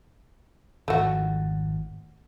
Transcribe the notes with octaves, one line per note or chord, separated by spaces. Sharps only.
G#1 F2 G#2 A3 F#4